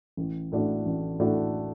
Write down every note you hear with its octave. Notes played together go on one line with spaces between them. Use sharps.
A1
A2 A3 D4 F#4
A1
A2 A3 D4 F#4